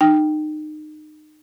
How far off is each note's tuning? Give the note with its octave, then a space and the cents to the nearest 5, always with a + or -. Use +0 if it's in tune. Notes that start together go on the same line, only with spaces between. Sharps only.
D#4 -30 G5 +0